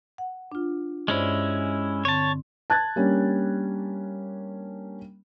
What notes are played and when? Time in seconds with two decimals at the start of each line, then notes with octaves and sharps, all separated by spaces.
0.18 F#5
0.52 D4 F4
1.08 G2 G#3 C#4 E4 C5 D5
2.05 D3 C4 C#5 A5
2.70 A5 F#6 G#6 A6
2.96 G3 A#3 C#4 D4